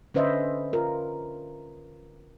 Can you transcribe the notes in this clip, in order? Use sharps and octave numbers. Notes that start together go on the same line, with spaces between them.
D3 C#4 B4 C5 D#5 E5
F4 A#4